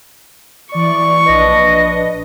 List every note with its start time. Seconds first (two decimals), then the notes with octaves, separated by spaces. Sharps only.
0.72 E3 D5 C#6
1.25 A#1 D4 B4 D#5